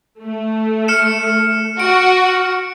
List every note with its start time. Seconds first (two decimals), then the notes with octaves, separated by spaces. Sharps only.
0.20 A3
0.88 F6 C#7 E7
1.80 F#4 D7